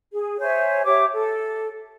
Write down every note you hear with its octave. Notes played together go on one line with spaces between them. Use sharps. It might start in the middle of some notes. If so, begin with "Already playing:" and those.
G#4
C5 C#5 E5 G#5
G4 C#5 E5 D6
A4